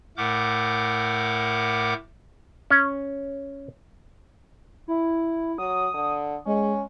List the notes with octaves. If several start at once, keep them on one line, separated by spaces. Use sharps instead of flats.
A2 A3 A#4 F#5 D6 G6
C#4
E4
F#3 D#6
D3
G#3 C#4